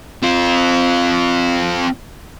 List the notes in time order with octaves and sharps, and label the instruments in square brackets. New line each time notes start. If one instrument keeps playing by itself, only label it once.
[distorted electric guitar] C4 F4